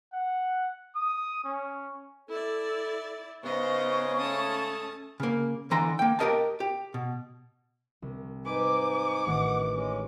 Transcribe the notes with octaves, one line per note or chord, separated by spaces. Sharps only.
F#5
D#6
C#4
E4 A4 D5
G#2 C#3 B3 C5 D#5 C#6
A3 C#4 A5 D#6
C#3 A#3
D3 E3 A#5 C6
A#3 G5
G4 G#4 A#4 D#5 F5 A5
G4
B2
C2
G#2 D#4 B4 G#5 D6
A1 D#3 F#5
G#3 C#4